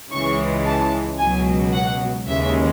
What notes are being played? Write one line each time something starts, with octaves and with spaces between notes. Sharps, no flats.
C#2 C#3 E3 G#3 C#6
A5
C#2 B2 F#3 G#5
F#5
D#2 C#3 E3 G#3 E5